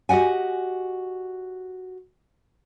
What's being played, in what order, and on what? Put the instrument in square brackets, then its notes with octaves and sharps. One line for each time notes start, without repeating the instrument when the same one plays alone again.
[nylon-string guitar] F#4 G4 D#5 F#5 G#5